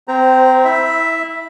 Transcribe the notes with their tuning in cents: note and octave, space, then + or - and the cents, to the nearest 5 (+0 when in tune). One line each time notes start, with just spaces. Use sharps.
C4 -20 C5 +0 A#5 +0
E4 -20 E5 +0